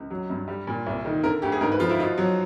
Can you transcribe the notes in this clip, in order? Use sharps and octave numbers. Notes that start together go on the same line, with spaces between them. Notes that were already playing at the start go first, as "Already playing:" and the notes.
Already playing: C#2
F#3
G2
G3
A#2
C2
D#3
D3 A#4
D2 G4
G#4
G#2 A#4
B4
F3 F4
E4
B2 F4
F#3